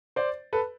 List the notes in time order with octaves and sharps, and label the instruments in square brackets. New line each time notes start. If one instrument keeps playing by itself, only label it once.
[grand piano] C5 D5
A4 B4